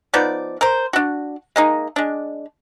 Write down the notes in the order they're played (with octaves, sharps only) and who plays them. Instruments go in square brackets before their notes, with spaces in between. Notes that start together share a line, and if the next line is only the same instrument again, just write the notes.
[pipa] F3 B3 D#4 D5
A#4 C5
D4 F#4
G#3 A#3 D#4
G#3 D4